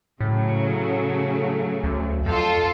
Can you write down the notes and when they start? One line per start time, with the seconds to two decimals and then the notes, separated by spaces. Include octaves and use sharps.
0.20 A2 C#3 F#3 A3
1.84 D2
2.26 F2 F4 A4